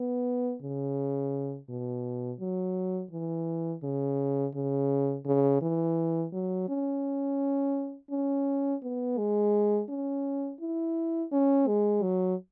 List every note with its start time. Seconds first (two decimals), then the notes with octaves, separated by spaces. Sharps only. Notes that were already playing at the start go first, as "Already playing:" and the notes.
Already playing: B3
0.62 C#3
1.69 B2
2.40 F#3
3.11 E3
3.83 C#3
4.54 C#3
5.25 C#3
5.62 E3
6.33 F#3
6.69 C#4
8.11 C#4
8.82 B3
9.18 G#3
9.90 C#4
10.61 E4
11.32 C#4
11.67 G#3
12.03 F#3